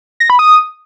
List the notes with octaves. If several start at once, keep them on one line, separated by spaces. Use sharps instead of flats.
A#6
B5
D#6